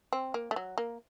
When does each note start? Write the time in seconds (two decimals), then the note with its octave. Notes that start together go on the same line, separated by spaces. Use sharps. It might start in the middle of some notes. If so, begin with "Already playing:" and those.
0.13 C4
0.34 A#3
0.51 A3
0.56 F#3
0.78 A#3